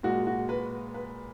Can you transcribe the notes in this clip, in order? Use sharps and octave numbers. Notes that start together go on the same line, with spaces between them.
A#2 G#3 F#4
F#4
B4
B4